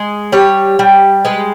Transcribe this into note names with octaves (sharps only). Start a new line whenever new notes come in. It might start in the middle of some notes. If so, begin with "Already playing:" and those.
Already playing: G#3
G3 C#5
G3
G#3 B4